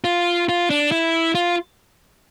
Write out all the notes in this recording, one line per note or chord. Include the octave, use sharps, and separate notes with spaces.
F4
F4
D4
E4
F4